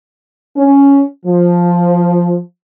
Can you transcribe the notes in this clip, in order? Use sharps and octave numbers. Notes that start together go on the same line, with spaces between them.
C#4
F3